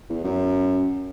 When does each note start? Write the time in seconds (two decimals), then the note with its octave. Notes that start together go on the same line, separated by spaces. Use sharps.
0.09 E2
0.24 F#2